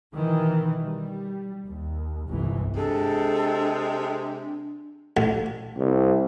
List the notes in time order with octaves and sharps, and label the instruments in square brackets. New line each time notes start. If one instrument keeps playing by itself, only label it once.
[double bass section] B2 D#3 E3
G3
D#2
G1 C2 G#2 E3
[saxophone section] C3 G#3 [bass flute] D4 [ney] A4
[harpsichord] A1
[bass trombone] C2